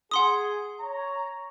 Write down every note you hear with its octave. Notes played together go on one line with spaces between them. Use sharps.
G#4 F#5 C6 D#6
C#5 A#5